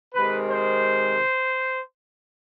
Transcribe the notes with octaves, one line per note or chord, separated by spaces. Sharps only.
C3 D#3 G#3 B4
C5